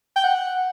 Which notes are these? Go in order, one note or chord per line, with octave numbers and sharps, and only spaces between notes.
G5
F#5